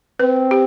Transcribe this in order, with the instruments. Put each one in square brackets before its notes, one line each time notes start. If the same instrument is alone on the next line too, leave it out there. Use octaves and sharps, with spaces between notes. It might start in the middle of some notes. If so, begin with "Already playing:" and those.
[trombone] C4 [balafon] B4
[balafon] G4